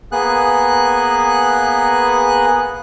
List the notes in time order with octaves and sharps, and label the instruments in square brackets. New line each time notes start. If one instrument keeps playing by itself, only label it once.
[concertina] A#3 B3 G#4 F#6